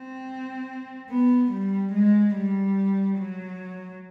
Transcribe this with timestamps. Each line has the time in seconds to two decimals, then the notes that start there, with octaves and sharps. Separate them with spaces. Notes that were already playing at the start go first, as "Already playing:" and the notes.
Already playing: C4
1.10 B3
1.52 G3
1.93 G#3
2.35 G3
3.18 F#3